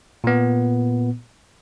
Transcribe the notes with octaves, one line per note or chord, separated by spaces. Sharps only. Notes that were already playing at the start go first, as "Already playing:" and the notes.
A#2 B3